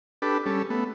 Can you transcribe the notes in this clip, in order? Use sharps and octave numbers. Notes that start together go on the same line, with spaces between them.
D4 G4 A4 B4
G3 C#4 A4
A3 B3